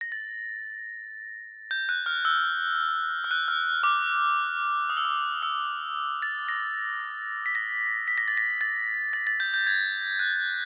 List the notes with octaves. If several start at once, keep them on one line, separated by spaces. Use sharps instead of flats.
A#6
A6
G6
F#6
F6
E6
F6
F#6
F6
D6
D#6
E6
D#6
E6
A6
A#6
B6
A#6
B6
A#6
A6
A#6
A6
A6
A6
G6
G6
G#6
F#6